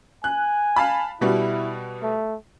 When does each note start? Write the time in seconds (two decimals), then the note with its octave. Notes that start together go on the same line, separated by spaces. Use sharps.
0.24 G#5 F#6
0.76 F5 A5 B5
1.21 B2 G3 E4 F#4
2.03 A3